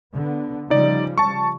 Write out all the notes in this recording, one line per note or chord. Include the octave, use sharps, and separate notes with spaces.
D3 B3
C#3 F3 G3 D#4 D5
A5 C#6